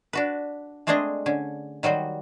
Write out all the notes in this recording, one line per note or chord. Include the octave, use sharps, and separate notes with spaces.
D4 F#4 B4
G#3 A3 C4 D4 G#4 D#5
D3 C#4
D#3 F#3 G3 F#4 C5